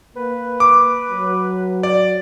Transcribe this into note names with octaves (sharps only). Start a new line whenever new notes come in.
A#3 B4
D6
F#3
D5